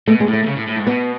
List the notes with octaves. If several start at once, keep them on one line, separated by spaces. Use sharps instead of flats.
B2 A3
G#3
A2
A3
B2
C#3
A2
A2
G#2
B2 B3